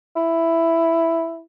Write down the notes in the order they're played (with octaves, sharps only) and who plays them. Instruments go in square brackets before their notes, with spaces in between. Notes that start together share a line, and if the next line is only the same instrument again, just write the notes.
[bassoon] E4